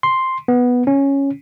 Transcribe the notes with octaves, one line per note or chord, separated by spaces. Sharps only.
C6
B3
C#4